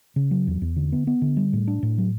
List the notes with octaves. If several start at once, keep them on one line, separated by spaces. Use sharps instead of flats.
C#3
F#3
E2
E2
D3
B3
B3
D3
G3
A2
D4
A2
F#3